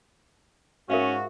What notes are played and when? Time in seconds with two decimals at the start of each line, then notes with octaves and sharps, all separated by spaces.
0.90 G#2 C#4 F#4 A#4 E5 F5